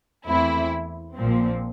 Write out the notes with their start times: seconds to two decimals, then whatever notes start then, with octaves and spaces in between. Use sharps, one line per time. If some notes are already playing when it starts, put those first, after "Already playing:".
0.26 E2 E3 A3 C4 E4
1.15 A#1 A#2 F3 C4